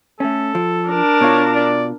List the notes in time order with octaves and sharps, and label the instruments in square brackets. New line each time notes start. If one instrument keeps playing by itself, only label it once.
[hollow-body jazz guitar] A3 C#4 [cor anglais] A4
[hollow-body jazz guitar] F3
[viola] D4 A#4
[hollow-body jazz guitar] B2 F4 [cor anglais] C#5
[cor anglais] D5